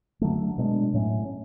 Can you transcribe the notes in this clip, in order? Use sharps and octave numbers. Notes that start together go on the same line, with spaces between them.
D3 F#3 A3
B2 G#3 B3 D4
A2 F#3 A3 C#4